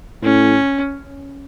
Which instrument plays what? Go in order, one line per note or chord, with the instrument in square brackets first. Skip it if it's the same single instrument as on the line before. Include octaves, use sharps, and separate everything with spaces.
[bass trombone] A2 [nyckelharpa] C#4